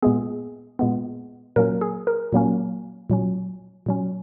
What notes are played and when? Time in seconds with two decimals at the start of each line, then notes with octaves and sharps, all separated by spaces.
0.02 A#2 G#3 B3 G#4
0.79 A#2 G#3 B3
1.56 A#2 F#3 A#3 C#4 A#4
1.81 G#4
2.07 A#4
2.33 A#2 F#3 A#3 C#4
3.10 A#2 F#3 C#4
3.86 A#2 F#3 C#4